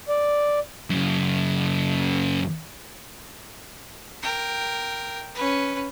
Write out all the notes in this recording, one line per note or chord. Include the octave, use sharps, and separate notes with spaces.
D5
F#2 C#3
A#4 G5
C#4 B4